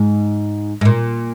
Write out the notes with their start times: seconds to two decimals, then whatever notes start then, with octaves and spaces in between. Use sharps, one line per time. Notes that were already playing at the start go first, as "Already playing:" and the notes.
Already playing: G#2
0.81 G#2
0.85 A#2